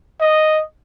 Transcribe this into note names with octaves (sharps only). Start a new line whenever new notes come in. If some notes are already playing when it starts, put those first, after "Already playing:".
D#5